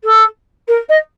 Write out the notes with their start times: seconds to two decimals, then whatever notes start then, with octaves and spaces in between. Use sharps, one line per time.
0.04 A4
0.68 A#4
0.88 D#5